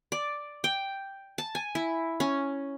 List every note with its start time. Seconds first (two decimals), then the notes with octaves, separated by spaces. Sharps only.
0.12 D5
0.64 G5
1.38 A5
1.55 G#5
1.75 E4
2.20 C#4